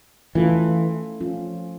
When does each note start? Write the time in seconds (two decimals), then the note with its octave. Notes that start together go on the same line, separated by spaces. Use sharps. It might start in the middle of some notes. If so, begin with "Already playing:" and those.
0.35 E3 A3 C#4 F4 A4
1.21 F3 C#4 F4